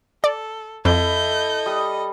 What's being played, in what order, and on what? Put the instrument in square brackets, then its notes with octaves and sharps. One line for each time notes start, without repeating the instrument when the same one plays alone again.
[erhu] A4 [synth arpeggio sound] D5
[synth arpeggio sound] F2 [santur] E4 [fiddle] A4 D#5 [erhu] G6
[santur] G3 D#6